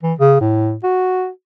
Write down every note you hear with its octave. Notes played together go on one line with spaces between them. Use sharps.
E3
C#3
A2
F#4